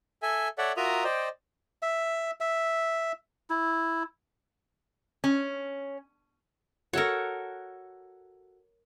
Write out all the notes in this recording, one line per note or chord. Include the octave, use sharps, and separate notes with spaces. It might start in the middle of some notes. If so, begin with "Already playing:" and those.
A4 E5 G#5
A4 C#5 D5 E5 F#5
F4 F#4 A#4 E5 A#5 D#6
C5 D5 D#5 G5
E5
E5
E4
C#4
F#4 A4 A#4 C#5 C#6